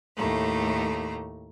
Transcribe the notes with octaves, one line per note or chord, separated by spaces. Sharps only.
D#2 A2 A3 A#5